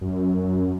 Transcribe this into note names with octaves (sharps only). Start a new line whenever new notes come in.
F#2